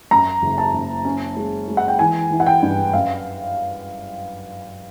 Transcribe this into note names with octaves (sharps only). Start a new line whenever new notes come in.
F#2 A#5
F#1
A5
F#1
C#4
G#3
G#3
F#5
G5
E3 G#5
E3
F#5
G5
G2
F#2 F5